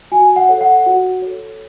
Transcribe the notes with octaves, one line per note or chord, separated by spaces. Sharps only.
F#4 G#5
F#5
A4 C#5
F#5
F#4
A4 C#5